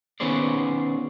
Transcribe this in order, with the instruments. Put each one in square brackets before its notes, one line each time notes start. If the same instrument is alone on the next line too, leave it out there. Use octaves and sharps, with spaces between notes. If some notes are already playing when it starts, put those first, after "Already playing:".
[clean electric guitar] D#3 B3 C#4 G#4 C5 D5